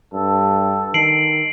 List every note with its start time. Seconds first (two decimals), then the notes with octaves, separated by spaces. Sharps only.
0.14 G2 A4
0.94 D#3 C7 D7 F#7